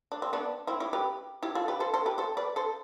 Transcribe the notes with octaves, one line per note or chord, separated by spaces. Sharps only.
D4
C4
B3 D4
C4 E4
E4 G4
G4 B4
E4 G4
F4 A4
G4 B4
A4 C5
A4 C5
G4 B4
A4 C5
B4 D5
A4 C5